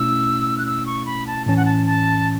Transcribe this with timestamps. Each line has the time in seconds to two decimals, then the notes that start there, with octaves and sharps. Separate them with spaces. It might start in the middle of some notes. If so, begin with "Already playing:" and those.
Already playing: B2 A3 C#4 E4 E6
0.59 F#6
0.66 E6
0.86 C#6
1.06 B5
1.27 A5
1.46 A2 E3 C#4 A5
1.57 F#5
1.65 A5
1.86 A5